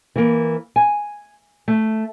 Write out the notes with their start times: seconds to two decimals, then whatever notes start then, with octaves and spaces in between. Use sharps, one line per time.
0.16 E3 A#3
0.76 G#5
1.68 A3